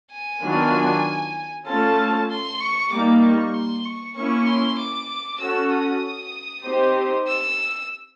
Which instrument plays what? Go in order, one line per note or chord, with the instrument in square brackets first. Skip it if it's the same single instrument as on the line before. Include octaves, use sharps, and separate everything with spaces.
[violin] G#5
[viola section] D#3 F#3 B3 D4 F4
[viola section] A3 C#4 F4 A4 [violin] A5
[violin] C6
C#6
[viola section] G3 A#3 D#4 [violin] D6
[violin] C#6
C6
C#6
[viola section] A#3 C#4 E4 [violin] C#6
[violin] C6
D6
[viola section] C#4 F#4 A4 [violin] E6
[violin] D#6
[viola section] C4 D#4 G4 C5
[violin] E6